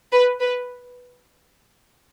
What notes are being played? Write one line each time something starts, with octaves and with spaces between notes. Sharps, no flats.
B4
B4